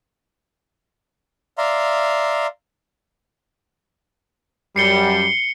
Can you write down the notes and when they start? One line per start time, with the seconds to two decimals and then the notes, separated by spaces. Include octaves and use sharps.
1.58 D5 E5 F5 A#5 C6
4.76 F#2 G3 C7 C#7 G7